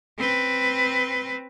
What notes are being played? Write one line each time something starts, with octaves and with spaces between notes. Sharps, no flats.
C4 B4